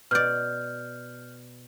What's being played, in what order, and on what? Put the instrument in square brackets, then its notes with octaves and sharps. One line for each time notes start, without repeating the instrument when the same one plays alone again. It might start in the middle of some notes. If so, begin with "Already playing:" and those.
[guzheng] B2 D5 [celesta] F6 G6